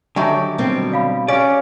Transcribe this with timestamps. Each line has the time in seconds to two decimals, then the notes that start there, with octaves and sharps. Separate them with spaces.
0.16 D3 D#3 F#3 G4 C#5 E5 G#5
0.58 B2 G3 C4
0.92 D5 F5 B5
1.28 C#4 G4 D5 F5